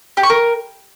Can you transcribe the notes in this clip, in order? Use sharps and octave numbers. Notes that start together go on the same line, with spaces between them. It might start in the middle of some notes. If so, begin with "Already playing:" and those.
G4
C#6
A#4